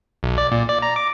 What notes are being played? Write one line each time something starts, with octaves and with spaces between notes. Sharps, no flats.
B1
D5
A#2
D5
A#5
D6